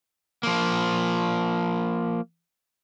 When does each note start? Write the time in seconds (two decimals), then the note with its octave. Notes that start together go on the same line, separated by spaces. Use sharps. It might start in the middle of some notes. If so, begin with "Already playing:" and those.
0.43 F3 A#3